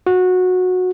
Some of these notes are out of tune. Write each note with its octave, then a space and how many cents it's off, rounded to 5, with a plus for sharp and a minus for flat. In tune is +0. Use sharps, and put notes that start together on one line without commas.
F#4 -15